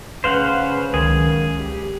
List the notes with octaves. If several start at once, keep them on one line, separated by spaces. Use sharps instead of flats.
C#3 A3 C#4 B4 C5 F5 F#5
C#2 D#3 F#3 G#4
G4